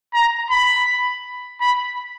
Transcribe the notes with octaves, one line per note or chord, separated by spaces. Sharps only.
A#5
B5
B5